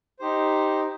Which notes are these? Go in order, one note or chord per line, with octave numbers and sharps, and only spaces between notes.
D#4 G4 C5